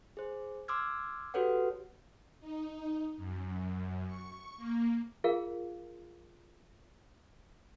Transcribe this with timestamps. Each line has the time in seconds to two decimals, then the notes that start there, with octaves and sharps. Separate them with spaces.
0.17 G#4 C5
0.68 C6 D6 E6 F6 G#6
1.34 F#4 G4 A4 B4 C#5 F#5
2.40 D#4
3.17 F#2
4.05 C#6
4.57 A#3
5.24 F4 G#4 A#4 F5